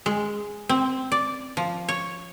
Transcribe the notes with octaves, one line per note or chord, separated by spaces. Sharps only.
G#3
C4
D5
F3
C#5